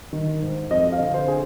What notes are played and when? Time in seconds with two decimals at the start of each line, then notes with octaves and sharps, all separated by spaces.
0.13 D#3
0.42 G#2
0.71 F2 D#5
0.92 F5
1.00 D3
1.14 C5
1.28 D3 G#4